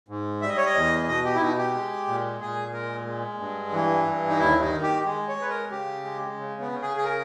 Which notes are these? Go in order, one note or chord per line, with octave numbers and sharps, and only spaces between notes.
G#2
G3 E5
D#5
C#5
D#5
E2
B2 D#5
G4
E4
B2 D#4
G4
G#3
A#2
A#2 G#4
G#3 A#4
G#3
G2
E3
G2
D#4
D#2 E4
D#4
D#3
G4
G#3
C#5
G#3 B4
A#4
C#3 G4
G#3
C#3
B3
C#3
G#4
G#4
A#4